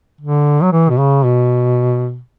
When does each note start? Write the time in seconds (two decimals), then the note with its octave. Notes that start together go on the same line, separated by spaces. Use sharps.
0.21 D3
0.63 F#3
0.72 E3
0.90 B2
0.99 C#3
1.25 B2